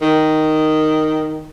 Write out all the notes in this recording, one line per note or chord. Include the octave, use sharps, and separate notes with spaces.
D#3